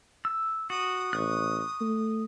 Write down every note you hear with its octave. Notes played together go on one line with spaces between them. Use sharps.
E6
F#4 D#6
A1 C#6 F#6
A3